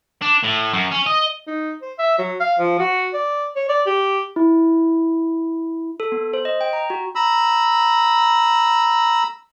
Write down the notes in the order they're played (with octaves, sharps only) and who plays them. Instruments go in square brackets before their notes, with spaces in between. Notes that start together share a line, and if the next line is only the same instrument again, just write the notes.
[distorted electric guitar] D4
A2
F#2
C#4
D#5
[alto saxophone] D#4
C5
E5
F#3
F5
F3
F#4
D5
C#5
D5
G4
[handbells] E4
A4
B3
C5
D#5
G5
A#5
F#4
[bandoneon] A#5 B5 E6